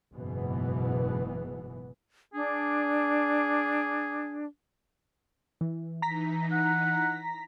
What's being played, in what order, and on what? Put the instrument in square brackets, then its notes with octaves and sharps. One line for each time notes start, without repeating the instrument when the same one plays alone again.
[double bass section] F#1 G#2 B2 E3 B3
[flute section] D4 [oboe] G#4
[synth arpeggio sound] E3
[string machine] E3 D#4 [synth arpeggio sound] A#5 A#6 B6
[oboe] F#5